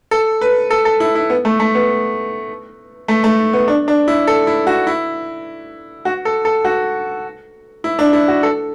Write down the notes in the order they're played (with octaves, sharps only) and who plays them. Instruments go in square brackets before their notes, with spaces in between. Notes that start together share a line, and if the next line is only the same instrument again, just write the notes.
[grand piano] A4
B4
A4
A4
E4
E4
B3
A3
A3
B3
A3
A3
B3
D4
D4
E4
A4
E4
F#4
E4
F#4
A4
A4
F#4
E4
D4
E4
F#4
A4